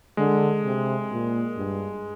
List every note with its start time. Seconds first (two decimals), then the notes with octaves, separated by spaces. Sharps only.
0.17 D3 G#3
0.64 C3
1.11 A#2
1.57 G2